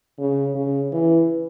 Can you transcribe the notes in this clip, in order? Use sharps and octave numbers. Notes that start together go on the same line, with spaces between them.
C#3
C#3
E3